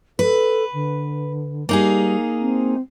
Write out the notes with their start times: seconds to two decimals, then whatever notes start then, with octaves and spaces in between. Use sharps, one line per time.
0.19 A4 B4
0.74 D3
1.69 G3 A#3 D#4 G#4
2.41 C4